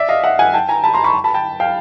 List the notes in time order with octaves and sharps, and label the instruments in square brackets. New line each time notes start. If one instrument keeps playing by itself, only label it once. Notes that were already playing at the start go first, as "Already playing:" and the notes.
Already playing: [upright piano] D5 E5
D#5 F5
E5 F#5
F#5 G#5
G5 A5
G#5 A#5
A5 B5
A#5 C6
B5 C#6
A5 B5
G5 A5
F5 G5